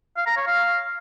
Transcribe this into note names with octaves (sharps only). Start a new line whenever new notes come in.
F5
A#5
C#5
F5